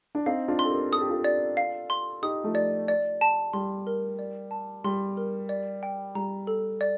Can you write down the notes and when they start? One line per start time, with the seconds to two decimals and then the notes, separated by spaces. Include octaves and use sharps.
0.15 D4
0.26 C4 D#4 F5
0.48 D4 F4
0.59 C6
0.65 A4
0.70 G4 A#4
0.92 A4 D#6
1.01 G4
1.10 F4 A4
1.24 D5
1.57 F5
1.90 C6
2.22 D#4 G4 D#6
2.44 F3 A3
2.55 D5
2.88 D5
3.21 A5
3.53 G3 C6
3.87 A#4
4.19 D5
4.51 A5
4.84 G3 C6
5.17 A#4
5.49 D5
5.83 G5
6.15 G3 A#5
6.47 A4
6.81 D5